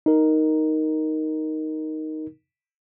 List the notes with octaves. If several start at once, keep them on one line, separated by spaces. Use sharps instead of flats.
D#4 A#4